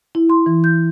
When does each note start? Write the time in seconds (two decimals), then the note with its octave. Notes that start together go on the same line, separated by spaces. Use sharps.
0.15 E4
0.29 C6
0.46 E3
0.64 G6